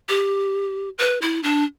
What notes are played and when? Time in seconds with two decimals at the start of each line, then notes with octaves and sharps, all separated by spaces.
0.09 G4
0.98 B4
1.22 E4
1.43 D4